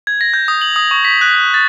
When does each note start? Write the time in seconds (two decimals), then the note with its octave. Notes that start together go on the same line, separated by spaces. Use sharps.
0.07 G#6
0.21 A#6
0.34 G6
0.48 D#6
0.61 F#7
0.76 D#6
0.91 C#6
1.05 B6
1.21 F#6
1.35 B6
1.54 A6